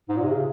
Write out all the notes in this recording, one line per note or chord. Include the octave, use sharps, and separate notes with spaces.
G#2
A#2
C3
C#3